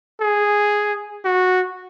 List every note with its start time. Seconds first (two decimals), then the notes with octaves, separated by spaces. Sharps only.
0.21 G#4
1.25 F#4